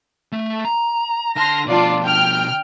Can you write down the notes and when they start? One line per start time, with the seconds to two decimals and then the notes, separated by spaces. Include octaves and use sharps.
0.32 A3 E5
0.65 A#5
1.36 D3 A5 C6 F6 A#6
1.67 B2 F3 D4 F4 D5
2.04 G5 F6